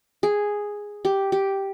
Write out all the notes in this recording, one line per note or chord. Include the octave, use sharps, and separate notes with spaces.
G#4
G4
G4